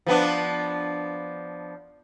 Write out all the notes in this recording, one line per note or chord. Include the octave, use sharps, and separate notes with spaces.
F3 B3 D4